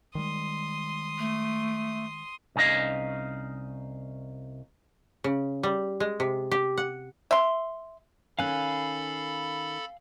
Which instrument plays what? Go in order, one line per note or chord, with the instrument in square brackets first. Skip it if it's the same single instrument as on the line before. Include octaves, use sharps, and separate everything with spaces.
[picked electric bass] D#3 G3 G#3 [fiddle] C6 D#6
[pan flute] A3
[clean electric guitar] C2 C#4 D#4 D#5 F5
[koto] C#3
G3
G#3
C3
G4
F#5
[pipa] E5 C6
[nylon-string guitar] D#3 C#4 [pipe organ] A4 B5 [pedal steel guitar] F5 G#5 F#6